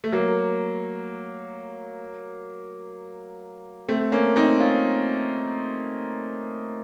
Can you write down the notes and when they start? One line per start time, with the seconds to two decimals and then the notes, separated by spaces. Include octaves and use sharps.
0.04 A3
0.12 F#3 A#3
3.88 A3 C4
4.12 A#3 C#4
4.36 C4 D#4
4.59 C#4 F4